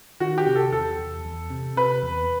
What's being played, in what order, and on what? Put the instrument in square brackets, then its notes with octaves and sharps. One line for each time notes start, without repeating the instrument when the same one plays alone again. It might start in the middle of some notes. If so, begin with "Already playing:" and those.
[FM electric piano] D#3 [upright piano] F#4
[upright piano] G4
[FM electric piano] C3
[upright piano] A4
[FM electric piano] E2 [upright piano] A4
[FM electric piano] E2
E2
C3
[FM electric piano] C3 [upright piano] B4
[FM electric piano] E2